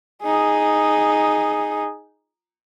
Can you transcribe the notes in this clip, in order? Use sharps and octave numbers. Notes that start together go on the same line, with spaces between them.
D#4 G#4